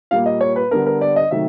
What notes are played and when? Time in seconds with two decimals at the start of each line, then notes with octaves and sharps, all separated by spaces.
0.11 A#2 G3 A#3 F5
0.26 D#5
0.41 C#5
0.56 B4
0.71 D3 G3 B3 D4 A#4
0.86 A#4
1.01 D5
1.16 D#5
1.31 C3 D#3 F#3 A3 E5